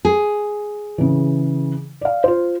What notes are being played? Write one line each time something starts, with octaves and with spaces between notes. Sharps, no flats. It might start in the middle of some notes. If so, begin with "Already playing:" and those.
G#4
C#3 E3
D5 F5
F4 C5